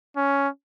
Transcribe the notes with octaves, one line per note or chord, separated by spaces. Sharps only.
C#4